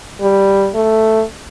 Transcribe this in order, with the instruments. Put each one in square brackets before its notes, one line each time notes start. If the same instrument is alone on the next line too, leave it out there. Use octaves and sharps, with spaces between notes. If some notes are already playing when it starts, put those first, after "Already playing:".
[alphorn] G3
A3